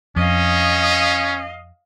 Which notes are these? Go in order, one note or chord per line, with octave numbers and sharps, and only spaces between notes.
F2 C#4 D#5 F5